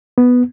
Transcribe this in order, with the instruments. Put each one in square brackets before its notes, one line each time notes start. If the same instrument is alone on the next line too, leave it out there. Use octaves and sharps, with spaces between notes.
[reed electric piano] B3